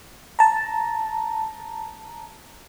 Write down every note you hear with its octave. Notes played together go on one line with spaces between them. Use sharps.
A5 A#5